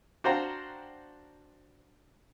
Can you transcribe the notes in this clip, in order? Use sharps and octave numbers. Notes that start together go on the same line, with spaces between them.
D4 F#4 C5 F5 G5 A#5